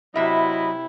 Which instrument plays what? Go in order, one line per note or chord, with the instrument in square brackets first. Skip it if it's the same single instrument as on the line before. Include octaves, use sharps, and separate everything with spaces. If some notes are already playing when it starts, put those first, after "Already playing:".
[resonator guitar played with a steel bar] C3 E5 [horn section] F#3 D#5 B5 [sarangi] E4